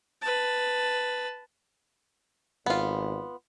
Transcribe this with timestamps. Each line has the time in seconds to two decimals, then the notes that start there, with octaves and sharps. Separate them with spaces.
0.22 B4 A5
2.66 G#1 B3 F4